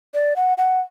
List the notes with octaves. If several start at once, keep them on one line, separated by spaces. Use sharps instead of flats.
D5
F#5
F#5